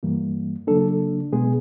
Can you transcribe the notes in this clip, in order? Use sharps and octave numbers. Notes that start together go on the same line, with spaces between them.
G2 E3 G3 A#3
C#3 F#3 A#3 D4 A4
B2 G#3 B3 G#4